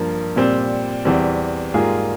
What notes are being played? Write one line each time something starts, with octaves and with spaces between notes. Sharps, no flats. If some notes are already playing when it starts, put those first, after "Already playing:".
Already playing: G2 F3 A#3
A#2 G3 C4
E2 E3 G3 C4
G#2 G3 A#3 F4 G#4